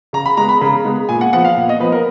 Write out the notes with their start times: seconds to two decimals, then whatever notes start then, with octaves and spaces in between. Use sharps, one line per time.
0.13 C#3 A#5
0.26 B5
0.37 G#3 B3 A#5
0.49 B5
0.61 C#3 B5
0.85 G#3 B3
1.09 A#2 G#5
1.21 F#5
1.33 F3 B3 F#5
1.45 F5
1.57 A#2
1.69 D#5
1.80 F3 B3 B4
1.92 A#4